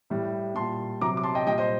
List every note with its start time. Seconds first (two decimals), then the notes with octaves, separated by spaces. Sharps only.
0.10 A2 G3
0.55 A#2 G3 A5 C6
1.01 C3 F#3 A#5 D6
1.17 D6
1.23 A5 C6
1.35 D#5 G5
1.47 A#2 G3 D#5 G5
1.58 C5 D#5